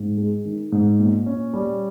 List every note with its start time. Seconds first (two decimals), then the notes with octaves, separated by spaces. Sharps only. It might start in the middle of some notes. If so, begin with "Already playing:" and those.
Already playing: G#2
0.17 G#3
0.45 D#3
0.72 G#2
0.99 A#2
1.26 C#4
1.54 G3